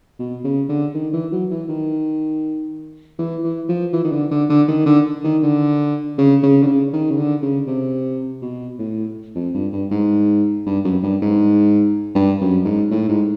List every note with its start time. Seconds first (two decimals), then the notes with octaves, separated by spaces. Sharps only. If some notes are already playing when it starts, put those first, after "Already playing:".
0.19 B2
0.44 C#3
0.69 D3
0.94 D#3
1.13 E3
1.32 F#3
1.51 E3
1.68 D#3
3.18 E3
3.43 E3
3.68 F3
3.93 E3
4.04 D#3
4.12 D3
4.31 D3
4.49 D3
4.68 D#3
4.86 D3
5.24 D#3
5.43 D3
6.18 C#3
6.43 C#3
6.62 D3
6.67 C#3
6.93 D#3
7.11 C#3
7.17 D3
7.42 C#3
7.67 C3
8.42 B2
8.79 A2
9.35 F2
9.54 G2
9.72 G2
9.91 G#2
10.66 G2
10.84 F#2
11.03 G2
11.22 G#2
12.15 G2
12.41 F#2
12.65 G#2
12.91 A2
13.08 G#2